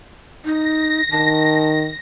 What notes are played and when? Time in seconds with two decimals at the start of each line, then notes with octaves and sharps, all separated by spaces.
0.45 D#4 A#6
1.11 D#3 A5